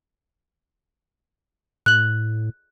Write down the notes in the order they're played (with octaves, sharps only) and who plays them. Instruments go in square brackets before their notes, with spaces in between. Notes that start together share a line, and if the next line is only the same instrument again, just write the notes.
[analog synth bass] A2 [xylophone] F#6 F#7